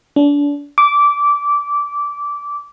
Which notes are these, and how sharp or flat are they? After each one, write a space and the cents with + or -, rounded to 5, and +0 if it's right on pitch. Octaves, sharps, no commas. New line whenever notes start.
D4 -30
D6 -15